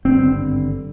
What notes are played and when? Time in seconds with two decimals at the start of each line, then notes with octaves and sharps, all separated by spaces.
0.05 G#1 G2 D3 C4